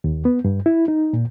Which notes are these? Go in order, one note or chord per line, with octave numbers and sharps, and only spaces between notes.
D#2
B3
G2
E4
D#4
A#2